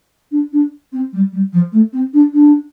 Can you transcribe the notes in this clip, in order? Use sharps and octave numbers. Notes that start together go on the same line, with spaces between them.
D4
D4
C4
G3
G3
F3
A3
C4
D4
D4